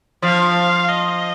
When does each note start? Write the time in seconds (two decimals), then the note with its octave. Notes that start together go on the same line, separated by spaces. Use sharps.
0.22 F3 F5
0.89 D#5